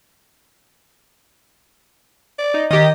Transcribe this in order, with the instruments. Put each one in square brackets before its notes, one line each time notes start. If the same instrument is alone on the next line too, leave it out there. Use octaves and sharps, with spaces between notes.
[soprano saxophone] D5
[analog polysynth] D#4
[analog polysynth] D#3 G4 [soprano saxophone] D#5